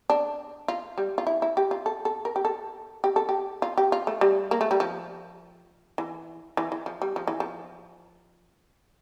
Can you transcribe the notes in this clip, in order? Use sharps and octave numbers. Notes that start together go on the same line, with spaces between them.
D4
F4
G3
F4
E4
E4
G4
F4
A4
A4
A#4
G4
A4
G4
A4
G4
F4
G4
F4
A3
G3
A#3
A3
G3
F3
E3
E3
E3
F3
G3
F3
E3
F3